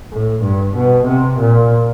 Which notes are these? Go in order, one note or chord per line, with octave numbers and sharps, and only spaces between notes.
A2
G2
B2
C3
A#2